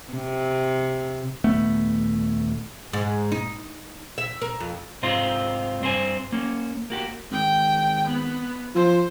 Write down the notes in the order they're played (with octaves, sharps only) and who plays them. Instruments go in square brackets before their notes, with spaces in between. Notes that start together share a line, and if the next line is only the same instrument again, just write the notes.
[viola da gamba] C3
[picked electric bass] D#1 A3 B3
[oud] G#2
D#4
E5
A#4
F2
[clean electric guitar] G#2 C3 C4 D#4 F4
G2 C4 C5 G#5
A#3 C#4
A#3 F#4 G4
[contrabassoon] G#1 [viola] G5
[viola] B3
[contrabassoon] F3 [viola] C5